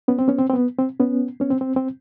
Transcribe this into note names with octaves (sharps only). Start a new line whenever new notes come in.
B3 C#4
C4
B3 C#4
C4
C4
B3
C4
B3 C#4
B3 C#4
C4
C4
C4